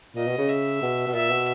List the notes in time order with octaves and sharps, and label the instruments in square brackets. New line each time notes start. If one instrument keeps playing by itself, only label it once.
[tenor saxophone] A#2 [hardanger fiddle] D#5
[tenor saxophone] B2
C#3
[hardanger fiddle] E5
[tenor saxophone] B2
B2
[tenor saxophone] A#2 [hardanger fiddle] E5
[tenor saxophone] B2